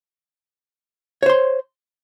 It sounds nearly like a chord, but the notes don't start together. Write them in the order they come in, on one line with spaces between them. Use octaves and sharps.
C#5 C5 C6